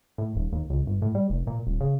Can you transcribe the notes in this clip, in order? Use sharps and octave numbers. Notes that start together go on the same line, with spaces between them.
A2
D#1
D#2
C#2
G1
A2
G3
F1
A#2
D#1
C#3